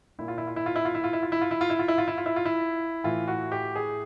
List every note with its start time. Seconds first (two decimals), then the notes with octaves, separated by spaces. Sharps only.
0.19 A#2 E4
0.28 F4
0.38 E4
0.47 F4
0.56 E4
0.66 F4
0.76 E4
0.85 F4
0.95 E4
1.04 F4
1.13 E4
1.23 F4
1.32 E4
1.41 F4
1.51 E4
1.61 F4
1.70 E4
1.79 F4
1.88 E4
1.98 F4
2.08 E4
2.18 F4
2.26 E4
2.36 F4
2.45 E4
3.04 A2 E3 F4
3.28 F#4
3.52 G4
3.76 G#4